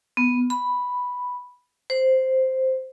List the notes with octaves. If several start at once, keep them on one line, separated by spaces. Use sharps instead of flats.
B3
B5
C5